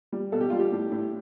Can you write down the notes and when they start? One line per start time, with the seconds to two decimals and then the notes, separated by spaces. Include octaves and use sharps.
0.12 G3
0.32 B2 A4
0.41 G4
0.50 G3 F4
0.59 G4
0.72 A2
0.91 A2